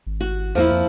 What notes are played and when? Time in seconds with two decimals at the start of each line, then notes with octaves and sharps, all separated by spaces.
0.07 G#1
0.21 F#4
0.55 E2 F3 A#3 E4
0.72 F2